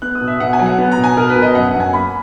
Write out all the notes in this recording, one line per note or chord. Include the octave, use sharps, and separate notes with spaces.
B3 F#6
D#6
B2
E5
B2 F#5
G#5
F#3
F#5
B3
A#5
B2
G#5
B2 A#4
B4
B2
D#5
F#2 F#5
F#5
F#2
G#5
A#3 B5